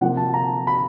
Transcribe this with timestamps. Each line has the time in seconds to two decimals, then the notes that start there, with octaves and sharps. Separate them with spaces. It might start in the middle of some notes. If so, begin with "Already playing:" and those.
0.01 C3 F3 A#3 F#5
0.17 A5
0.34 A#5
0.67 B5